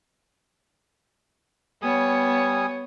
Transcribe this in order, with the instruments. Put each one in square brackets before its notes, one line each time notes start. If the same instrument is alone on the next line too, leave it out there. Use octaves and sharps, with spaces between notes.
[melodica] G3 G#5 D#6 [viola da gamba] B3 C#5